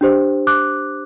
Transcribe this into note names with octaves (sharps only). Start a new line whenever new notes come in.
D4 G4 C5
D6 F#6